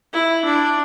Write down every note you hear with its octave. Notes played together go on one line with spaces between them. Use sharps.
E4
D4